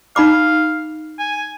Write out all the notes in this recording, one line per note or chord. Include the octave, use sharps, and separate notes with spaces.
D#4 F5 B5 D6
G#5